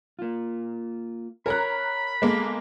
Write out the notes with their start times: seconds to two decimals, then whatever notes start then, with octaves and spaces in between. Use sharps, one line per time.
0.19 A#3 F4
1.46 A#4 C#5 A#5 B5 F#6
2.22 G#3 A#3 B3 A4